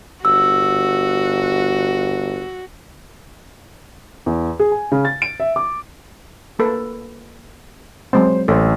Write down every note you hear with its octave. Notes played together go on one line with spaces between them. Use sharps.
G1 F#4 E6
E2
G#4
G#5
C#3
A6
D7
E5
D6
A#3 A4 B4
F#3 G#3 C4 C5
A1 A4 C5